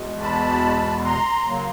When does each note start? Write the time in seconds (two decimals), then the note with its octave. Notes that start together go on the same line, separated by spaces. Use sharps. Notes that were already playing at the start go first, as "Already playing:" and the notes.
Already playing: E2 B2 G#3
0.21 A5 B5
1.05 A#5 C6
1.47 C#3 F#3 A#3